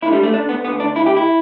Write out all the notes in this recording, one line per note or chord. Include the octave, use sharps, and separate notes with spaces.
D2 D3 E4
G3
A3
D4
B3
D2 D3 B3
D4
E4
G4
E4